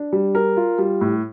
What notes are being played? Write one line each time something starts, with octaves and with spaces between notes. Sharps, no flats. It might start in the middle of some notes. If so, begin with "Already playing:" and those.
Already playing: D4
G3
A#4
F4
G3
A2